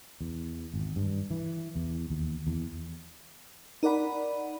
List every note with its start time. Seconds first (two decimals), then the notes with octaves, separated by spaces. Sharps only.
0.21 E2
0.74 G#1
0.96 G2
1.31 E3
1.76 E2
2.10 D#2
2.47 E2
3.83 D#4 A#4 D5 F#5 B5